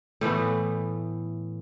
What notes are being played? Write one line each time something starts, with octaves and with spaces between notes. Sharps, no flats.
A2 E3 A3 B3